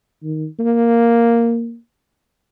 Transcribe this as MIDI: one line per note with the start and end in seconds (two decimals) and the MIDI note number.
0.23 0.46 51
0.59 1.76 58